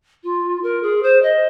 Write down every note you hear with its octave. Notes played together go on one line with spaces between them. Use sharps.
F4
A#4
G#4
C5
D#5